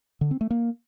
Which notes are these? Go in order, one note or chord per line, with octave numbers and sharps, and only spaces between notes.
D3
C4
A3
A#3